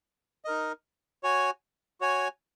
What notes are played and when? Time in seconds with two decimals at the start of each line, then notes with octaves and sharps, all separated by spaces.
0.45 D#4 A#4 D#5
1.23 F#4 C#5 G#5
2.01 F#4 C#5 G#5